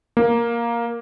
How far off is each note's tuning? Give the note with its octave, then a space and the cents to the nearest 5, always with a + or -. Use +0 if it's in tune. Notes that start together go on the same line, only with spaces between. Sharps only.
A#3 +5